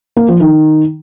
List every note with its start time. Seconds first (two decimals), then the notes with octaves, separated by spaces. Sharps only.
0.17 A#3
0.28 F3
0.40 D#3